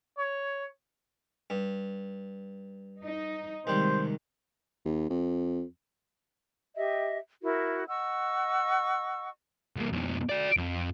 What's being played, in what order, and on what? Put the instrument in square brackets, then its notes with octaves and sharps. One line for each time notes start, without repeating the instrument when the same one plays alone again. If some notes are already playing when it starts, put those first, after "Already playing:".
[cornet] C#5
[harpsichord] G2
[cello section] D#4
[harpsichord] D#2 G3 [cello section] C3 D#3 G#3 [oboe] C5
[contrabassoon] D#2
F2
[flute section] G4 D#5 E5
E4 F#4 A#4
D#5 F#5 C#6 E6
[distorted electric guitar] C2 A#3
F2 B2
F#4 D5
F2